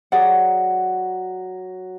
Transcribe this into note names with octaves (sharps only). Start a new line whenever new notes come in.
F#3 G#4 D5 F#5